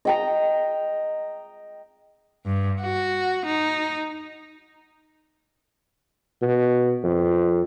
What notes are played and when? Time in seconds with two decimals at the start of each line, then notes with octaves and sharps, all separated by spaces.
0.05 D#5 G5 A#5
2.46 G2
2.82 F#4
3.46 D#4
6.42 B2
7.03 F2